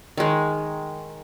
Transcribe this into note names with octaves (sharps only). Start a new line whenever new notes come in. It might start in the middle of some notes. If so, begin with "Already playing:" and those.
D#3 G#3